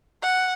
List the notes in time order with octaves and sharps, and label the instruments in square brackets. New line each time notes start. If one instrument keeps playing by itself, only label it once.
[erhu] F#5